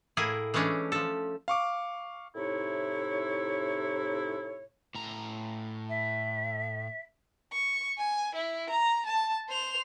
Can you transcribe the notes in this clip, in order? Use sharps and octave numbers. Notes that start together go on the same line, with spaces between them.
A2 A#3 E4 G#4 G#5
E3 G#3 A3 C#4 D4
F3 A4
F5 C#6 D6
A2 C3 D#4 E4 C#5
A2 A#5
E5
C#6
G#5
E4
A#5
A5
C5 F7